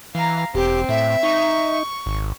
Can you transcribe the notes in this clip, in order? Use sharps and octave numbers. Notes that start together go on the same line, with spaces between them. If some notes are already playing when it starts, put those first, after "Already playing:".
E3 F5 A#5
E1 C4 G4
A2 E5
D#4 C#6
G#1